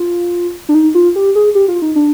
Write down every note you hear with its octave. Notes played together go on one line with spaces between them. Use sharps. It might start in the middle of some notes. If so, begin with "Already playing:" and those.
Already playing: F4
D4
D#4
F4
G4
G#4
G4
F4
D#4
D4